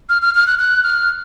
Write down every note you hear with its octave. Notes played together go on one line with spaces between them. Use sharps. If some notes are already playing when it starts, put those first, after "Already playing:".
F6
F6
F6
F#6
F#6
F6